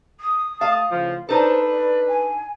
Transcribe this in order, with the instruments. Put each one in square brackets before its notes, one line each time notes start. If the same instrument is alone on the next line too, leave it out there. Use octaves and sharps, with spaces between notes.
[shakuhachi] D#6
[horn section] A3 D#5 A5 [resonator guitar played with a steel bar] F5
[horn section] A2 C#3 F3
[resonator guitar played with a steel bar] D4 D#4 A4 [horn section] B4 [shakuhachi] C5
[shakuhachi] D5
G#5